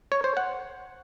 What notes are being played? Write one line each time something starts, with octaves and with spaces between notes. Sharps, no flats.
C#5
C5
F#5